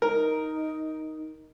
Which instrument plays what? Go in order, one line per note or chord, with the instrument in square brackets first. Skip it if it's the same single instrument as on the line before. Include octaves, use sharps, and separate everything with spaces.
[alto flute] D#4 [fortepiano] A#4